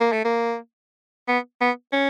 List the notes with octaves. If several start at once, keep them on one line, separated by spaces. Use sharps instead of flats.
A#3
A3
A#3
B3
B3
C#4